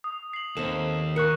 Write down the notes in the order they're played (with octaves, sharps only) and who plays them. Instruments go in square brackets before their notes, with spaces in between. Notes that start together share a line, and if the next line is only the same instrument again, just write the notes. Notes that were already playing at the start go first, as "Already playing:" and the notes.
[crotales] D#6
C7 F#7
[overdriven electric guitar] D#2 [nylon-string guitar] C4 A4 [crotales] E7
[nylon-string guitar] A#4 [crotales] C#6 F#6 C#7